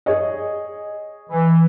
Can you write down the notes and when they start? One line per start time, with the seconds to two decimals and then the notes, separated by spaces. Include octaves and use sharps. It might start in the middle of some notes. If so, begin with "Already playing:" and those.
0.06 G#4 C#5 D#5
1.30 E3